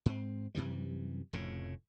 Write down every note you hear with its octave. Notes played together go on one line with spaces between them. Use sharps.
G#2 C4
F#2 C3 E3 G3
F1 F2 A2 C#3